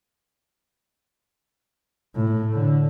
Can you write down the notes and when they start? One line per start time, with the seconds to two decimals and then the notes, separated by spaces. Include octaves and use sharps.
2.16 A2
2.54 D3